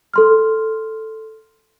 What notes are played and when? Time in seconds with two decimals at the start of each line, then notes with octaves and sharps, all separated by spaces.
0.14 A4 C6 F6